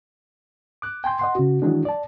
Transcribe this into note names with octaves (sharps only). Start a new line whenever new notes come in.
D6 F#6
G5 G#5 C6 G6
D#5 F#5 C6
C#3 F#4
D#3 E3 F#3 G#3 D4
D5 A5